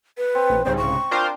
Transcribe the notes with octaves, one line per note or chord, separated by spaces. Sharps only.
B4
C4
A#1
C2 G#2 C#3 C5
C#6
D4 F4 A#4 C5 G5